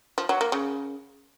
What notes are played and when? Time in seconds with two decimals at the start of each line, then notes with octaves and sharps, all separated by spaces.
0.18 F3
0.29 F#3
0.41 A#3
0.52 C#3